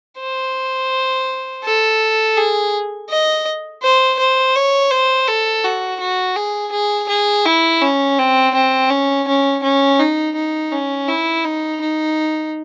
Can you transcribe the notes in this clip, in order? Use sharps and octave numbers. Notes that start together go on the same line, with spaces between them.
C5
A4
G#4
D#5
C5
C5
C#5
C5
A4
F#4
F#4
G#4
G#4
G#4
E4
C#4
C4
C4
C#4
C#4
C#4
D#4
D#4
C#4
E4
D#4
D#4